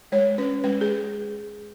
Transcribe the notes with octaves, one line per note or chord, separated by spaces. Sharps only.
G#3 C#5
C#4 B4
G#3 B4
G#4